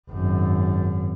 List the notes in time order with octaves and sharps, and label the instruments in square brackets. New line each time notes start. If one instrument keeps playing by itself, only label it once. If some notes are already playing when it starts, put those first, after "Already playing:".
[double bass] G#1 F#2